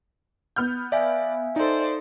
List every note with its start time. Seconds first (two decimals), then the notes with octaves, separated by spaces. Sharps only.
0.56 B3 F6 G6
0.92 D5 E5 F5 G#5
1.56 D#4 A4 C5 D5